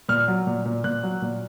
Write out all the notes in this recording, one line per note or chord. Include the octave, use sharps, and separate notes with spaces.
A#2 F6
F#3
A#2
A#2
A#2 F#6
F#3
A#2